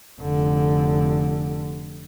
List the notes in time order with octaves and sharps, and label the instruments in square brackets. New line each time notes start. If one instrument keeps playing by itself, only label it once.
[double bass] F1 D3